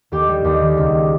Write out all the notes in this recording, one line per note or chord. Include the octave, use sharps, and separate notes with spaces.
D#2 G4
G3
D#2
D#3
C#2
G3